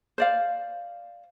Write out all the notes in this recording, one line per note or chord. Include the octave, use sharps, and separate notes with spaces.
C5 D5 F5